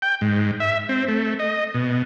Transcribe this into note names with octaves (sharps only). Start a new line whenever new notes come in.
G5
G#2
E5
C4
A3
D#5
B2